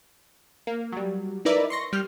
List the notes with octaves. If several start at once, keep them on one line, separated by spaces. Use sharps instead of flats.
A#3
F#3 G3
D#4 E4 A#4 B4 D5 E5
C6 C#6 A#6
G3 F6 G6